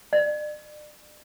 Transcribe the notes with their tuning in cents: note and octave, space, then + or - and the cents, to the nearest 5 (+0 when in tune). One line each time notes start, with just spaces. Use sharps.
D5 +30